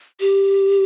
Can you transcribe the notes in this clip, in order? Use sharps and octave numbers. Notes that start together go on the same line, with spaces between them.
G4